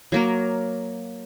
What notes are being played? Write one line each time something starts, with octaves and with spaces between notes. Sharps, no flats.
F#3 A#3 A#4